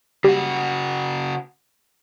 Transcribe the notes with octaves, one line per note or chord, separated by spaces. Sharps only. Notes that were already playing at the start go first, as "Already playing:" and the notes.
C#3 G3 F#4